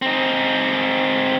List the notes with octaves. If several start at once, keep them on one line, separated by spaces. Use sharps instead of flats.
C4 D#4